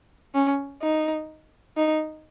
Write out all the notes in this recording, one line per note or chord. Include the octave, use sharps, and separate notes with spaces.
C#4
D#4
D#4